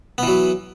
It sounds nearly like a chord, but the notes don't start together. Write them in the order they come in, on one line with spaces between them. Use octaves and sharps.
B3 E3 F#3